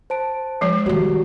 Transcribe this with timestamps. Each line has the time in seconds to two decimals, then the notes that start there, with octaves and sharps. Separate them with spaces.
0.10 C5 A5 D7
0.61 F3 G#3 C#5
0.86 D#3 G3 F#4 G4 C#5